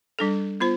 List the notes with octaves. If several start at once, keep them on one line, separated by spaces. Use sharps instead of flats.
G3 D4 A4
B3 F4 C5